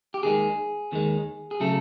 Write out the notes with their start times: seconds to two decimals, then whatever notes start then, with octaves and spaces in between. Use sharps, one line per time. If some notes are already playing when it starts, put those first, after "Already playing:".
0.14 G4
0.23 D#2 D#3 G#3 G#4
0.92 D#2 D#3 G#3
1.51 G#4
1.60 C#3 F#3 A3 A4